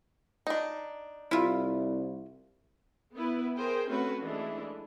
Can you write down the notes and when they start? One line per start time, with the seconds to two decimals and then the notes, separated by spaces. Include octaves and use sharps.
0.47 D4 D#4
1.31 C2 E4 F4
3.15 B3 E4 B4
3.57 G#4 A#4 C5 G5
3.88 A3 C4 C#4 F#4 B4
4.21 E3 G#3 A3 D4 E4